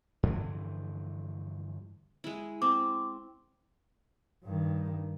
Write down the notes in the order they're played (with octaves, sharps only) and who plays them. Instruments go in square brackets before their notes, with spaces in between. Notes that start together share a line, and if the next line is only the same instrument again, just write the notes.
[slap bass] G2 D3 E3 F3
[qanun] G#3 E4
[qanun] C4 [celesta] D6
[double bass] G2 D#3